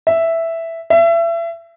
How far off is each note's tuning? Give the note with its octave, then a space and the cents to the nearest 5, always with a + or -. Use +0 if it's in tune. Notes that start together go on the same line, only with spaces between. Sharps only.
E5 +0
E5 +30